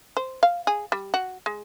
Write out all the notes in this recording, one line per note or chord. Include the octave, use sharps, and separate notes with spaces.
C5
F5
G#4
G3
F#4
G#3